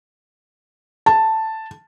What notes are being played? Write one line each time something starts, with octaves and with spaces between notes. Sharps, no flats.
A5